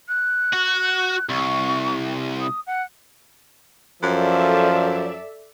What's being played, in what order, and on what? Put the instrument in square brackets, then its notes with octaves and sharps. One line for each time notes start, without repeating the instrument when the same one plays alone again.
[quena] F#6
[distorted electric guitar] F#4
[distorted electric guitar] C2 [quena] C#6
[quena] D#6
F#5
[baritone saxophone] F#2 [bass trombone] F3 [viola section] A4 D5 E5